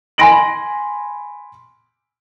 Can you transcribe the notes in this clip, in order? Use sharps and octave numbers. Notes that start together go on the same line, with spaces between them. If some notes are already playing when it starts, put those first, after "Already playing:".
G#5 B5 C6 A#6 D7 F#7